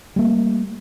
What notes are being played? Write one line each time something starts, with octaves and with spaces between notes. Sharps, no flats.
G3 A3 A#3